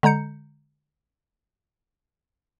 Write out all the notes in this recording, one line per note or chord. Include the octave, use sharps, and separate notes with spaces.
D3 G#3 A#5 G6 C#7